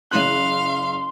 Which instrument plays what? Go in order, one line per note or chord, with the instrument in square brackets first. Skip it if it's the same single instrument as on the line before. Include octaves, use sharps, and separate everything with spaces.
[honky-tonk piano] F#1 E3 F#6 [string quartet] F5 [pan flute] C6